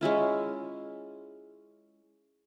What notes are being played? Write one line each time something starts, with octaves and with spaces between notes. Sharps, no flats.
G#3 C#4 E4 F4